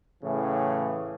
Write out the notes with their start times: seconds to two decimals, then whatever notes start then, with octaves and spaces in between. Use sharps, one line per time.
0.23 A2 C#3 E3